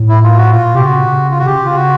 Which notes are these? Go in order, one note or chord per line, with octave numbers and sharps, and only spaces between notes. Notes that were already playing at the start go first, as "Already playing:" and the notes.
Already playing: A2
E4
F4
F#4
A#2 F4
C3 G4
C#3 F#4
F4
F#4
C#3 G4
F4
F#4